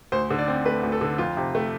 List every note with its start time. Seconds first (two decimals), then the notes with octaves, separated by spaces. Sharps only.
0.12 D2 C5
0.30 D3
0.39 D5
0.48 C4
0.65 A3 B4
0.83 D2
0.92 A4
1.01 D3
1.18 F2 F4
1.37 C3
1.55 A3